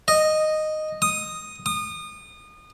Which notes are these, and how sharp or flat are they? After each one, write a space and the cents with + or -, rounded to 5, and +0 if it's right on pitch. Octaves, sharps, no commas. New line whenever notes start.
D#5 -5
D#6 -5
D#6 -30